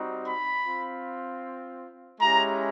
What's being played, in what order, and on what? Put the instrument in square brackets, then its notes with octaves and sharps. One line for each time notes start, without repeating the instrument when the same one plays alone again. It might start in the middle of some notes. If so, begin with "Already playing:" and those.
Already playing: [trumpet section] G3 C4 D#4 F#4
B5
C4 F4
G#3 C#4 E4 G4 A#5